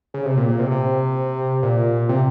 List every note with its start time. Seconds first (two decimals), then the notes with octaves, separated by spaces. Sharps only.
0.14 C#3
0.25 C3
0.37 A#2
0.49 A#2
0.60 C3
0.71 C3
1.63 A#2
2.09 C3